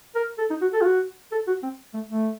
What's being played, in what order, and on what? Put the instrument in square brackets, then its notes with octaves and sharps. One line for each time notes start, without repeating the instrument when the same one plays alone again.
[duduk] A#4
A4
D#4
F#4
A4
F4
F#4
A4
F#4
C4
A3
A3